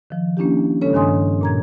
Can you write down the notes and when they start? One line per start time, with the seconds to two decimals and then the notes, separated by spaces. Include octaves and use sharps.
0.10 D#3 F3
0.37 A#3 C#4 D4 E4 G4
0.81 C#3 G#3 C#4 A4 C#5
0.93 G2 D#3 D4 G#5 C6 D#6
1.41 A#2 A#5 G#6